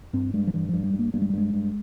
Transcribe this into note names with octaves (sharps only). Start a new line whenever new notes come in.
G2 C4
G2 G#3
F3
G2 E3
G2 F3
G3
G2
A#3
G2 A#3
G#3
G3
G2 G#3
G2